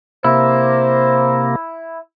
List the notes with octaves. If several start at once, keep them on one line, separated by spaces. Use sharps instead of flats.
C3 A#3 E4 C5